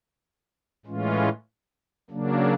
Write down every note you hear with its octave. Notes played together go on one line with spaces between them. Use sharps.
A2 E3 G#3 C#4 F4
C#3 F#3 A#3 D4